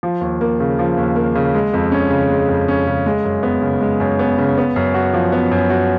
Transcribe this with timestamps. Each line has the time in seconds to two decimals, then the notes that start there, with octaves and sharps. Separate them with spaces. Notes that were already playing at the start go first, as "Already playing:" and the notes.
0.03 F3
0.21 D#2
0.41 A#3
0.60 C#3
0.79 F3
0.97 D#2
1.16 A#3
1.35 C#3
1.54 G#3
1.73 F2
1.92 C#4
2.10 C#3
2.30 G#3
2.49 F2
2.68 C#4
2.87 C#3
3.06 G#3
3.24 F#2
3.43 B3
3.62 C#3
3.81 G#3
4.00 F#2
4.19 B3
4.38 C#3
4.58 B3
4.76 F#2
4.94 F#4
5.14 F3
5.32 B3
5.51 F#2
5.70 F#4